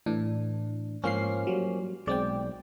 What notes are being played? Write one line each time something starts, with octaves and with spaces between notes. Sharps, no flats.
A2 E3 D4
G#2 F3 A#3 C#4 F5 C7
F#3 G3
B1 G#3 C4 D5 G5